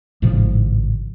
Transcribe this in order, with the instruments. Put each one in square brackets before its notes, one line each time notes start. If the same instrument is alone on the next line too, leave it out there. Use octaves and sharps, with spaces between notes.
[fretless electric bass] G#1 A2 C#3 F3